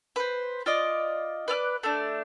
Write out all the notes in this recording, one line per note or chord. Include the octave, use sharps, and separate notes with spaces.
B4 C5
F4 D5 D#5
B4 D5 F6 F#6
A3 D4